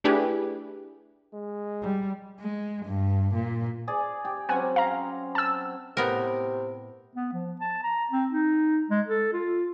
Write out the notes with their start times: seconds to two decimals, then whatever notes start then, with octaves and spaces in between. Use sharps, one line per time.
0.04 A3 D4 E4 G4 G#4 B4
1.33 G#3
1.82 G3
2.40 G#3
2.86 G2
3.34 A#2
3.88 G#4 D5
4.25 G4
4.49 F#3 C4 C#4 F#5 G#5
4.76 F5 A#5
5.35 A5 E6
5.97 A2 C3 B3 A#4
7.15 B3
7.33 F3
7.61 A5
7.83 A#5
8.11 C4
8.31 D#4
8.90 G#3
9.08 A4
9.33 F4